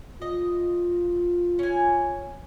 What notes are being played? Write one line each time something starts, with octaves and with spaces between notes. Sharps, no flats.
F4 D#5
C#4 G#5